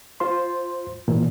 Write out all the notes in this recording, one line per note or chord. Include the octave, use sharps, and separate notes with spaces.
F4 C5 C6
A#2 E3